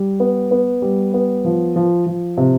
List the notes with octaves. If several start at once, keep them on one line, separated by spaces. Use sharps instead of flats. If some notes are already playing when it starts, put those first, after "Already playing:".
Already playing: G3
B3
B3
G3
B3
F3
F3
F3
C3